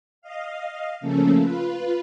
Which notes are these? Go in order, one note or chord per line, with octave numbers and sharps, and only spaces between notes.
D#5 F5
C#3 F3 A3 A#3 C#4 A4
F4 B4